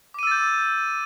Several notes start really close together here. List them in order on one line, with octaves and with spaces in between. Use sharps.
D6 D#7 E6 A6 G6